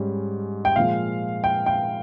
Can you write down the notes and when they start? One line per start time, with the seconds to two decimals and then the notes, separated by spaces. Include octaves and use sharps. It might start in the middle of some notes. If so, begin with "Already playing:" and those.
Already playing: G#2 G3 C#4
0.65 G5
0.76 A#2 F3 G#3 F5
1.44 G5
1.66 G5